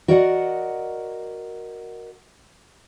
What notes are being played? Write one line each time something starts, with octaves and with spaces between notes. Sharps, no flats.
F#4 A#4 D5 D#5 F5 F#5